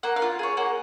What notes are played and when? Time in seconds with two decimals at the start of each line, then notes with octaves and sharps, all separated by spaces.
0.03 A#3 F#5
0.16 F5
0.22 F4
0.39 G#4 C#5
0.57 A#3 F#5